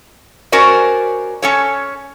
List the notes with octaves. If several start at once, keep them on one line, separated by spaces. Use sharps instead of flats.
C#4 F#4 A#4 C5 D5
C#4 A4 C#5